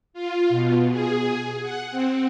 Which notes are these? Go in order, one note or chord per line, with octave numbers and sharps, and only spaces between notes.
F4
B2
G#4
F#5
C4